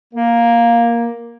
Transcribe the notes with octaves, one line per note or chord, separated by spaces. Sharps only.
A#3